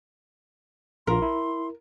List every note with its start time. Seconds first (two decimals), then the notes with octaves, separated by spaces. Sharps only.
1.07 A#1 F4 A#4 C6
1.22 E4